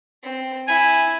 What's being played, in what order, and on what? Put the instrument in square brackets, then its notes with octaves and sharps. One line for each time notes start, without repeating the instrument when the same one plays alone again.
[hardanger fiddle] C4
[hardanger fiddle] E4 [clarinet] G#5